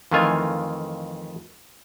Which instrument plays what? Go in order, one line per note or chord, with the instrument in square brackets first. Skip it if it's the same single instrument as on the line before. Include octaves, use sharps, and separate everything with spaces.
[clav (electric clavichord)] F2 D#3 E3 A3 F4 G#5